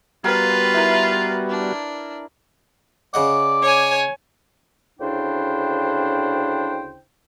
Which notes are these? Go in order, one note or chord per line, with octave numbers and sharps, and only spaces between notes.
G3 B3 F4 F#4 A#4 B4 F5 G5
E4 A#4
D4
C#3 D5 D#5 F#5
C#5 G#5
D2 C#3 D4 E4 C5 G5